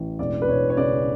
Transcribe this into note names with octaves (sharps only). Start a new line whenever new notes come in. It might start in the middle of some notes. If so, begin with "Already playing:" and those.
Already playing: A1
E1 D5
B4
E1 C#5
C#5
C#3 D5